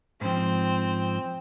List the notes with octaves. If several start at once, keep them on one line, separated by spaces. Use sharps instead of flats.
G#2 F3 C4